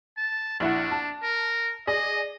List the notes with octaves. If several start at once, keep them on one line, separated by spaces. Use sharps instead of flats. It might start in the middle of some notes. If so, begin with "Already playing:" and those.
A5
A#1 D4 E4 F#5
A5
A#4
G#4 D5 D#5